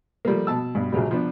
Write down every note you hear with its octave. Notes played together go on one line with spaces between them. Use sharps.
F3 G3 A3 A#3
B2 A5 E6
G2 B2
A#1 C#3 F#3 G3
F3 B3 D4